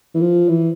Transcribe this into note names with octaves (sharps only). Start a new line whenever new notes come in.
E3
F3
E3